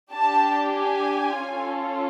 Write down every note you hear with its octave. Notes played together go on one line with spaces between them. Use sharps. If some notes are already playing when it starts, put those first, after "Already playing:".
D4 G4 A5
G#5
C#4 F4 A4